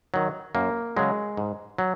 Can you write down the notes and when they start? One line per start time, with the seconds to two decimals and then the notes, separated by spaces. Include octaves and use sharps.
0.14 D#3 F#3
0.55 F#2 A#3
0.97 C#3 F#3 G#3
1.37 G#2
1.78 F#3